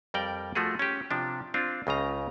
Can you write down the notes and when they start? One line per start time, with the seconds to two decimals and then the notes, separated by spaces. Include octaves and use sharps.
0.14 F2 G3 A#4 D5 G5
0.55 F3 A3 F#4 G#4
0.79 C#4 G4
1.11 C3 F3 D4
1.54 C4 D4 F4
1.87 C#2 C#3 D#5 A#5